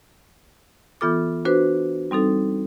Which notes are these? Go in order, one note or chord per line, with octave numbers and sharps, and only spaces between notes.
E3 B3 F4 A4 D6
D4 F#4 B4 C5
G3 C4 D#4 A4